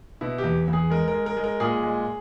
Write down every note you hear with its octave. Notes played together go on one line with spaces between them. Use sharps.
B2 E4
G4
E2
E2
G#4
G#3 A#4
A#4
G#3
A#4
G#3
A#4
A#2 G#4
G#3